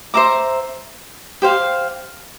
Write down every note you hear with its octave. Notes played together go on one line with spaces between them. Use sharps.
C5 E5 A#5 D6
G4 C5 F5